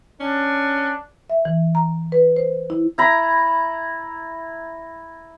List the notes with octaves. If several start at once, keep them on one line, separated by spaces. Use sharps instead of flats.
C#4 D4
E5
E3
A#5
B4
C5
E4
E4 A#5 B5